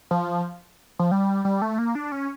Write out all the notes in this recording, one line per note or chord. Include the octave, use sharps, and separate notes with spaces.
F3
F3
G3
G3
A3
A#3
D4
C#4